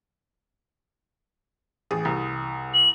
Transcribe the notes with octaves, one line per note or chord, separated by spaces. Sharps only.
A1 G#4 D#6
C2
F#7